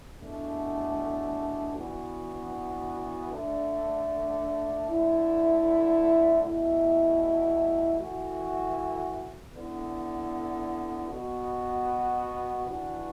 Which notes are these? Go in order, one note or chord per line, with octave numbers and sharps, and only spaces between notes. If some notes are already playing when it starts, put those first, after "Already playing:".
E2 B2 A3 D4
E3 B3 D4 F#4
D3 A3 D4
D3 A3 E4
E2 B2 A3 E4
E3 A3 F#4
D3 B3 E4
B2 B3 F#4
E3 D4 F#4